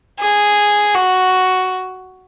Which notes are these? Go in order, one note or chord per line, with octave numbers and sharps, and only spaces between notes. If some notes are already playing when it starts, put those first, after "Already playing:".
G#4
F#4